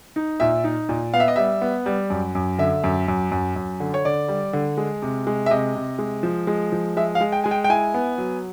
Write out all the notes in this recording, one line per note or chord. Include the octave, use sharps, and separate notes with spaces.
D#4
A#2 E5
D#4
A#2
B3 F5
E5
D#5
G3 E5
B3
G3
F#2
F#2
D3 E5
F#2
F#2
F#2
F#2
D3
C#5
D3 D5
G3
D3
G#3
C3
G#3
E5
C3 D#5
C3
G#3
F3
G#3
F3
G#3 E5
F5
G#3
G5
G#3 G#5
G5
G5
E4 G#5
B3
F#3